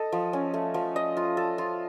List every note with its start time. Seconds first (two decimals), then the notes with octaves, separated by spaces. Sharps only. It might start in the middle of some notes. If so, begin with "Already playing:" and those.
Already playing: A4 D#5
0.12 F3
0.33 C#4
0.54 A3
0.74 F3
0.96 D#5
1.17 F4
1.37 A4
1.58 F4